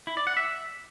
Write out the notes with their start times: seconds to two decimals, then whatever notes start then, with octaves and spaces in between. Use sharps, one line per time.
0.07 E4
0.17 D5
0.27 F#5
0.37 E5